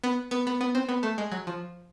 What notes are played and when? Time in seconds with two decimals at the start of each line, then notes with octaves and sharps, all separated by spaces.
0.04 B3
0.31 B3
0.47 B3
0.61 B3
0.75 C4
0.89 B3
1.03 A3
1.18 G#3
1.32 F#3
1.47 F3